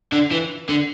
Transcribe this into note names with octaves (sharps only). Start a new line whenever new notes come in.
D3
E3
D3